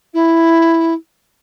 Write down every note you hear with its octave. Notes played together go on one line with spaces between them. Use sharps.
E4